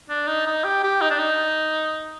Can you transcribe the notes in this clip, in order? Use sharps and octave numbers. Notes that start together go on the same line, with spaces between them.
D4
D#4
D#4
G4
G4
D#4
D4
D#4